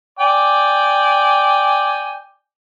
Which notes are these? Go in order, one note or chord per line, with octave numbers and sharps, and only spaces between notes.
D5 G5 G#5